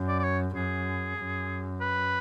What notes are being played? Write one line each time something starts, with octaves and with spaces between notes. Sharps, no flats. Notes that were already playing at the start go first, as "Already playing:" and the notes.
Already playing: F#2
D5
D5
C#5
F#2 G#4
F#2
B4